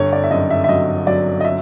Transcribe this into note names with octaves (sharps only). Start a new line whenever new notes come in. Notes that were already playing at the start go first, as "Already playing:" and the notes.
Already playing: G1 C#5
D5
E5
F#2 D#5
E5
E5
F#3 D#5
F#3 D5
D#5
E5